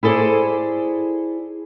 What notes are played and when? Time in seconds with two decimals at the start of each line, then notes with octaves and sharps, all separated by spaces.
0.03 E4 G#4 A4 C5 D5